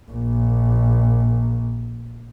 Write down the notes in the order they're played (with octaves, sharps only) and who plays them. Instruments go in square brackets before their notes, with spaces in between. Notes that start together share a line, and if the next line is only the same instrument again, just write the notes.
[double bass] A#1 A#2